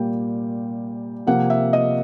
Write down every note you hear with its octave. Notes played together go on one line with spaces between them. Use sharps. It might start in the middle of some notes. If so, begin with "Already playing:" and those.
Already playing: A#2 G3 A#3 G5
C3 F3 A#3 F#5
E5
D#5